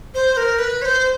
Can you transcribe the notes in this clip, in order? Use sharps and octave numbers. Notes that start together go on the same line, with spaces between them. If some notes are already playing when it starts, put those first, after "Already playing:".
C5
A#4
B4
C#5
C5